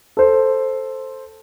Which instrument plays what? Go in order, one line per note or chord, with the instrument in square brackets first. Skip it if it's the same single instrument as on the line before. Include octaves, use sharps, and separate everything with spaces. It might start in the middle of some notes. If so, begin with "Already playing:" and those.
[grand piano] A4 C5